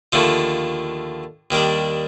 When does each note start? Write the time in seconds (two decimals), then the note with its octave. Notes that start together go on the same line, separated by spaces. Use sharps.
0.12 D#2 D3 F3 A3
1.51 D#2 D#3 G3 D4